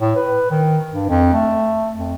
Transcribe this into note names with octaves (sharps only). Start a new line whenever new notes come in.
A2
B4
D#3
G2
F2
A3
F2